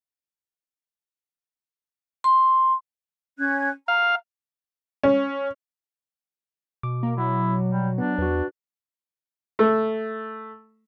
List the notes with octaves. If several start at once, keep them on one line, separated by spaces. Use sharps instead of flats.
C6
C#4 F#6 G#6
F5 A#5
C#4
B2 D6
A#3
F#3 E4
G3
B3 D4
E2 F#4 B4
A3